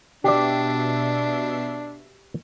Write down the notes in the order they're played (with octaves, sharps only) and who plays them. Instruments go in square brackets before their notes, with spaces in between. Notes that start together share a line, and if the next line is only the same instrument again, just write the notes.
[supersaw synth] B2 E5 C7 [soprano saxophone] D4 [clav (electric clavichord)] G4 D5